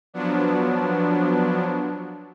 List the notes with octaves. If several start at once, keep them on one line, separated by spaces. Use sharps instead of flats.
F3 F#3 B3 D4